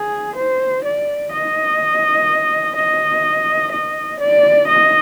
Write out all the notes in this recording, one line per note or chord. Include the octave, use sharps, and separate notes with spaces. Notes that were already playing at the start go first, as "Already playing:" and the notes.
Already playing: G#4
C5
D5
D#5
D#5
D#5
D5
D#5